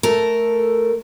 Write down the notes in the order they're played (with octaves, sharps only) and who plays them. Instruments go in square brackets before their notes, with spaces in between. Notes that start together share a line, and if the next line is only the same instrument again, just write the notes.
[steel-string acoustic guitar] A3 A4 A#4